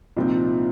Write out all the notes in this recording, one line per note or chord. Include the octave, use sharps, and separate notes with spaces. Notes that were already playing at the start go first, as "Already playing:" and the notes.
C2 A#2 F3 C4 D#4